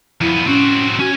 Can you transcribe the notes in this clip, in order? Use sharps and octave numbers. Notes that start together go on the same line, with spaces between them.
F2 B3 E4
C4 C#4 F#4
C#4 F#4 G#5